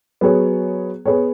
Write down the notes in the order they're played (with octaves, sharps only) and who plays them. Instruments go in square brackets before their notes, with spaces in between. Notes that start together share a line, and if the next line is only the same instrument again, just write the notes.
[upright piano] F#3 B3 G#4 C#5
B3 G#4 C#5